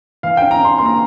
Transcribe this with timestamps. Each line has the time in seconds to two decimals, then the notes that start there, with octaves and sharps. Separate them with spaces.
0.23 E3 F5
0.37 C#4 G5
0.51 A#5
0.60 C#4 C6
0.78 A#3 C6
0.86 A#5